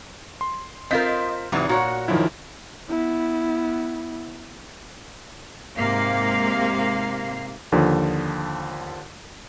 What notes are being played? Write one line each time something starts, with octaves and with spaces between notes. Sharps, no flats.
C6
C4 F4 A#4 D#5 G6 B6
G#1 C3 E3 F#3 D#6
A#2 F#4 C#5 F#5
F#2 D#3 F3 E4
B3 E4
G#2 C3 A#3 F5
D#2 D3 F3